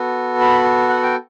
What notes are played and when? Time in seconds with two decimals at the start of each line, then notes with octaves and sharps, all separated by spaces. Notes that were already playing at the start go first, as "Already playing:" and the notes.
Already playing: B3 F#4 A4
0.41 B5
0.89 F#5
1.03 G5